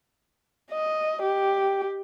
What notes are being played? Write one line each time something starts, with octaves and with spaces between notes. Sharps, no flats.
D#5
G4